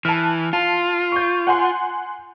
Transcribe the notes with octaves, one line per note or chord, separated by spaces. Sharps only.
E3 A5 F6
F4 A5
C#6 G6
F#5 G#5 C6